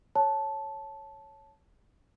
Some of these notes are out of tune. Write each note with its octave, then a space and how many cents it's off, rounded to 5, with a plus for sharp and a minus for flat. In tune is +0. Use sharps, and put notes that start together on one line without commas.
C#5 -5 A5 -10